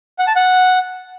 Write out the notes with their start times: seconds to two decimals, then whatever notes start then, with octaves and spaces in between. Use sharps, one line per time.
0.19 F#5
0.27 A5
0.36 F#5